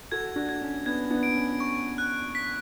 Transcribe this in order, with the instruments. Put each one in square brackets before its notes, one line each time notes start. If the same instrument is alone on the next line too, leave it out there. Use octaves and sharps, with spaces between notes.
[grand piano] F#4 A4 [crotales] G#6
[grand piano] D4 F#4
[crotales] G#6
[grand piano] C#4
[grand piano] B3 D4 [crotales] G#6
[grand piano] B3 D4
[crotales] D7
[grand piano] C#4
[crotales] C#6
F#6
B6